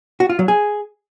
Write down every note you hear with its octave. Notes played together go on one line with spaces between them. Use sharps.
F#4
F4
F#3
G#4